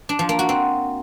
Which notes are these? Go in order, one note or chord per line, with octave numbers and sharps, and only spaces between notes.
D4
F3
A#3
F#4
C4